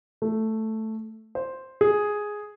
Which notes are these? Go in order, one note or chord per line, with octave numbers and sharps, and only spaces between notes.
A3
C5
G#4